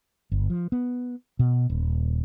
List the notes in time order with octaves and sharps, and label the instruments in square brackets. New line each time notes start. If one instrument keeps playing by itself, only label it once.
[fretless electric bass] G1
F3
B3
B2
D#1